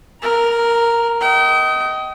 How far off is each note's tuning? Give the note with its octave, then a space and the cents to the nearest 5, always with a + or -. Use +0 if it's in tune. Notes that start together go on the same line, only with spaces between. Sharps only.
A#4 +0 A#5 +30
D#5 +15 G5 -40